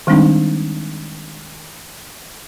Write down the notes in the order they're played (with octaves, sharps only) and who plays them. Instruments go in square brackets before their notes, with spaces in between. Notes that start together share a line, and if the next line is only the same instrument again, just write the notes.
[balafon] D#3 G3 G#3 C4 D4 D#4